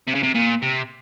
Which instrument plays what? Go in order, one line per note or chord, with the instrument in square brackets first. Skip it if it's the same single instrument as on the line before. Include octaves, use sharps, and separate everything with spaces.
[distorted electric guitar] C3
C#3
C3
A#2
C3